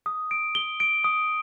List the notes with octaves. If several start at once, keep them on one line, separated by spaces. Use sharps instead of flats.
D#6
D7
G7
D7
D#6